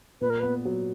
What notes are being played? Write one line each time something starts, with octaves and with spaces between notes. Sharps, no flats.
A#2 B4
A#4
B3 B4
F#3